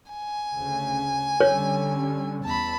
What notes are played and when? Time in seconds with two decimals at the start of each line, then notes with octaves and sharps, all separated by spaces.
0.12 G#5
0.53 D2 C#3
1.41 D3 G3 C#4 C#5
2.44 E2 A5 B5